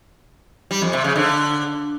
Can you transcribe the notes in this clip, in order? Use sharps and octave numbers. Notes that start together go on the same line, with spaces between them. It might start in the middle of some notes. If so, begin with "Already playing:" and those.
G3
F2
C3
C#3
D3